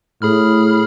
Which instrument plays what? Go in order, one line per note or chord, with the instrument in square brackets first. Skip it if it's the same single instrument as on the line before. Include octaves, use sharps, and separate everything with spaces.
[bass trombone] A2 [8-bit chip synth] G#4 B5 F6